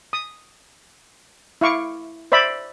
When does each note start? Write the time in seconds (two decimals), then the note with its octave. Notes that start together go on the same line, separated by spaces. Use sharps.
0.13 D#6
1.61 E4 F5 C#6 D6
2.32 C5 D5 E5 B5